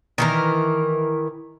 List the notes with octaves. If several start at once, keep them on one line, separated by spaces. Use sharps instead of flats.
D#3 E3 A#4